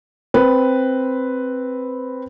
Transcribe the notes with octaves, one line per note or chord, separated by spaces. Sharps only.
C4 B4